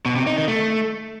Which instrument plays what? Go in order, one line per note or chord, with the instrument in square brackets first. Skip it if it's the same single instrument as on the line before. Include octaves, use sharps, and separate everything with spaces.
[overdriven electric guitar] B2
C3
D#4
D#3
A3